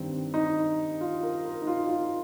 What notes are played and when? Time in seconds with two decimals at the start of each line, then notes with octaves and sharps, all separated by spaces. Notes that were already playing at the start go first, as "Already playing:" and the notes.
Already playing: G2 D#3 C4
0.34 D#4
1.01 F4
1.23 A#4
1.45 A#4
1.62 D#4
1.67 F4
1.89 F4